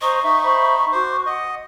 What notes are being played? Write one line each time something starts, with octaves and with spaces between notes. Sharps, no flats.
C5 D#5 A#5 C#6
D#4 E5
C5 E5 B5
F#4 C5 D6
D#5 F#5